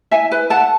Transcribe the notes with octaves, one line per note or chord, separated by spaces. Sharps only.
E4 E5 G#5
B4
A4 F#5 A5